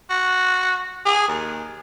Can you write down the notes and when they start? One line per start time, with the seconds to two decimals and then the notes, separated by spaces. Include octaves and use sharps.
0.10 F#4
1.05 G#4
1.28 D#2